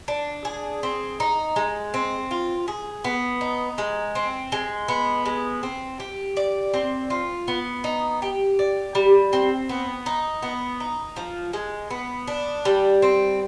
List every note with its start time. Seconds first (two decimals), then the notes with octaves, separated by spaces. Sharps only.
0.08 D4
0.45 G#4
0.83 C4
1.20 D#4
1.56 G#3
1.94 C4
2.31 F4
2.68 G#4
3.04 B3
3.41 D#4
3.78 G#3
4.15 C4
4.52 G#3
4.88 B3
5.25 G#3
5.63 C4
6.00 G4
6.37 D5
6.74 C4
7.10 F4
7.48 B3
7.84 D#4
8.22 G4
8.59 D5
8.95 G3
9.33 C4
9.69 B3
10.06 D#4
10.42 B3
10.80 D#4
11.16 F3
11.53 G#3
11.90 B3
12.27 D4
12.65 G3
13.02 C4